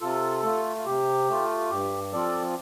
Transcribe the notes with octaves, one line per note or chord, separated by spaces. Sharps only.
C3 F4 A4
A3 F4
F4
C3 G4
A3 F4
G2 G4
F3 C4 F4 A4 D5